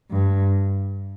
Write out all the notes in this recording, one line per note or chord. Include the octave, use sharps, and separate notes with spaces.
G2